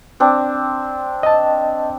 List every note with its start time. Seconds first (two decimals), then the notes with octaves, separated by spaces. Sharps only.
0.20 C4 D4
1.23 D#5 A5